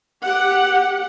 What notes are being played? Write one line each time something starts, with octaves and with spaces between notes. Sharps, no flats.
G4 F#5